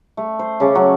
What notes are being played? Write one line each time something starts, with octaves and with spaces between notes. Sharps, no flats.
A3
C5
C#3 C#4 A5 D6
F#3